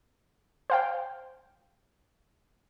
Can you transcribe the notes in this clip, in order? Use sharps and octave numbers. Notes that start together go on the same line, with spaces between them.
C5 F5 G5